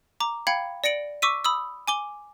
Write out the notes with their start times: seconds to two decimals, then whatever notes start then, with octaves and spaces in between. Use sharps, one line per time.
0.20 A#5 D6
0.47 F5 G5 B5 G#6 C#7
0.84 D5 A#6 C#7 D7 F#7
1.22 C#6 D6 E6 B6 D#7
1.45 B5 D#6 E6
1.88 G#5 D6 G7